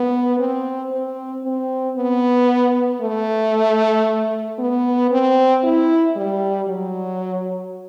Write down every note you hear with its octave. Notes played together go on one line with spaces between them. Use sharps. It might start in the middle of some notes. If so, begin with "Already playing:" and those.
Already playing: B3
C4
C4
C4
B3
A3
B3
C4
E4
G3
F#3